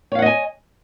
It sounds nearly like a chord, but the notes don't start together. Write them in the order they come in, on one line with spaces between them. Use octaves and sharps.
C#5 F5 F#5 D#5 G#5